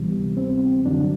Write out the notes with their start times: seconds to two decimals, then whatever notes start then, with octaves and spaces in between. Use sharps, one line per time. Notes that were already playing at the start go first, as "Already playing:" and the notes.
Already playing: D2 C3 E3 G3 B3
0.37 C4
0.85 F#2 D3 F#3 D4